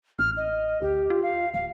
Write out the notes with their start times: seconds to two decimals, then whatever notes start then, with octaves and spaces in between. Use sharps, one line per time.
0.19 A1 F6
0.37 D#5
0.82 D2 G4
1.10 F4
1.23 F5
1.54 D1 F5